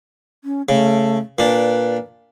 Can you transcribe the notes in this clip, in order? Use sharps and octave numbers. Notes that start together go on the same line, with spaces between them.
C#4
C#3 A3
A#2 D4 B4